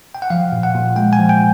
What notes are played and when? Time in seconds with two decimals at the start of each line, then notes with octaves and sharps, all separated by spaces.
0.15 G5
0.22 F#5
0.30 F3 F5
0.52 A#2
0.63 F#5
0.74 A#2
0.96 G#3 G5
1.13 G#5
1.19 F3
1.29 G5